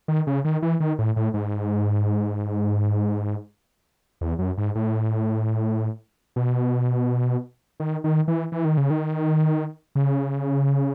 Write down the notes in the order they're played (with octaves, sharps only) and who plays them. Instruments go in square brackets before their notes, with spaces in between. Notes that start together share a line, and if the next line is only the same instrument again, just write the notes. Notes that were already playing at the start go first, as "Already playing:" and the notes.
[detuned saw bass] D#3
C#3
D#3
E3
D#3
A2
A2
G#2
E2
F#2
G#2
A2
B2
D#3
D#3
E3
E3
D#3
C#3
D#3
C#3